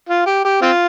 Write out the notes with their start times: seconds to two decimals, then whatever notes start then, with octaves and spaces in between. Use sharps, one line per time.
0.09 F4
0.26 G4
0.45 G4
0.62 C4 F4